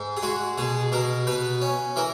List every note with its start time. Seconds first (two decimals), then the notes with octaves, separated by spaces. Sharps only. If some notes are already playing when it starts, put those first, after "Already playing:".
Already playing: G#2
0.17 G#4
0.23 G#3 F#4
0.58 B2 G#4
0.92 B2 A#4
1.27 B2 B4
1.62 C#4
1.96 E3 A#4